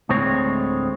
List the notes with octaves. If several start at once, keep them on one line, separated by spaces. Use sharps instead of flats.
D2 A2 G#3 C4 C#5